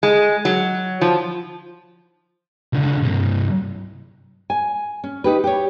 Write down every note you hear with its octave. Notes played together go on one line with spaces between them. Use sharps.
G#3
F#3
F3
C#2 D3
G2 C3
G#5
C#4
D#4 G4 B4
G4 C#5